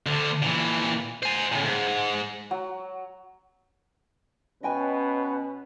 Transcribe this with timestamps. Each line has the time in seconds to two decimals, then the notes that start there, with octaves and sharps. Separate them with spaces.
0.06 D2 D3
0.42 A#2 E3
1.23 C5 G#5
1.52 A2 C#3
1.64 G#2
2.51 F#3
4.63 B2 C#4 B4 D#5 G5 G#5